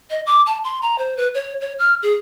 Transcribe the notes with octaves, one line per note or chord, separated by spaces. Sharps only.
D#5
D6
A5
C6
A#5
C5
B4
C#5
C#5
F6
G#4